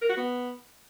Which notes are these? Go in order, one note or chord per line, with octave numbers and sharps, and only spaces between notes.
A#4
F#4
B3